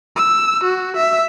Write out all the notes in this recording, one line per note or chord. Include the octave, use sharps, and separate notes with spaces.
E6
F#4
E5